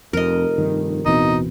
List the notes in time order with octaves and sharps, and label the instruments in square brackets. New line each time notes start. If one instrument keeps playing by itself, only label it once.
[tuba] F1 [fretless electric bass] F2 [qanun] A#4 D#5
[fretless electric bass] G2 D#3
[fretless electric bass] D1 E3 C4 [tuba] B2 [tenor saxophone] D#4